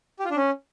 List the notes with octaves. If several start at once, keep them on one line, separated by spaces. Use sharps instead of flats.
G4
F4
D4
C#4